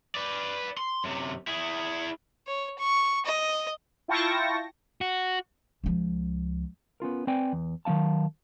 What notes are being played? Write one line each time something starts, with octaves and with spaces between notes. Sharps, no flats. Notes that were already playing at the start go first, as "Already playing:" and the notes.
B4 D5
C6
F#2 C3
E4 G#4
C#5
C#6
D#5
E4 F4 G5 A5 C#6 A#6
F#4
C#2 F3
B3 C#4 F4 A#4
C4 B4 D5 G5 G#5
E2
D#3 F#3 C4 F5 A5